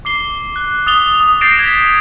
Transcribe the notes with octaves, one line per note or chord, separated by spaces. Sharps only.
D6 C7 G7
F#6
D#6 A6 F7 G7
D#6
G6 A6 A#6 C7 D7 E7
G#6 B6